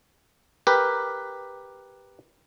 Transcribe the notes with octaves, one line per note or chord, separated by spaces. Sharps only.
G4 A#4 B4